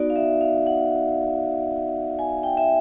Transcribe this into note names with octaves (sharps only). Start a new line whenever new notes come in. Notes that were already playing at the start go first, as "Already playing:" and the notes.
Already playing: B3 D#4 F#4 D5
F5
E5
F5
F#5
G#5
G5
E5